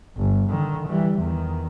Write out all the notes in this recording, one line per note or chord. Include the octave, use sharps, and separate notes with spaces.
G1
D3 D#3
E3 G3
E2 D#3